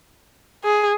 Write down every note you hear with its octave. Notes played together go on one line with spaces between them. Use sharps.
G#4